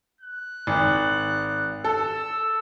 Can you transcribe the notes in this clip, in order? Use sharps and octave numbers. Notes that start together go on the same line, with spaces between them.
F#6
G#1
A4 E6